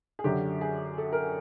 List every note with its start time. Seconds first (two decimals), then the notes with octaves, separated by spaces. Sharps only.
0.19 G#4
0.24 F#2 D3 F#3 G4
0.61 G#4
0.98 A4
1.13 A#4